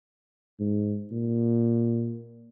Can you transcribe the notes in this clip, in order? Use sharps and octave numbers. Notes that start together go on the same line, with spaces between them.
G#2
A#2